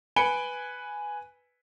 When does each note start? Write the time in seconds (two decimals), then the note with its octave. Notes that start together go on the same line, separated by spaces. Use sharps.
0.16 B4 G#5 B5 C#7 D7 G7